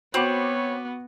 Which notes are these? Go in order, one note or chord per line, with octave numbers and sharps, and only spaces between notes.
B3 C4 F#4 C#5 B5 D6